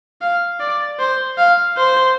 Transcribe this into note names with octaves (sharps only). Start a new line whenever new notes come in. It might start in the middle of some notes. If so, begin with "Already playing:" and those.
F5
D5
C5
F5
C5